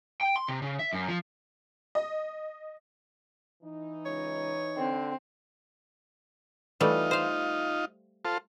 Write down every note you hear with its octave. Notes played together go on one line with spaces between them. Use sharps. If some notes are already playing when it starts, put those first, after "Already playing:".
G5
C6
C3
C#3
E5
F#2
F3
D#5
E3 D#4
C#2 C#5
D3 C4
E3 G3 A3 D#4 F4
C5 F5
F4 A4 C5